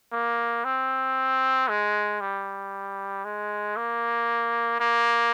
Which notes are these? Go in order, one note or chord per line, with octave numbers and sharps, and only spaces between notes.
A#3
C4
G#3
G3
G#3
A#3
A#3